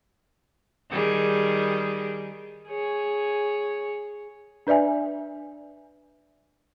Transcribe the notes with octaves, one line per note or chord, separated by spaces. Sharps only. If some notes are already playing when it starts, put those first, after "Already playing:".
D#3 G3 G#4
G#4 C#5
D4 B4 D5 E5 G#5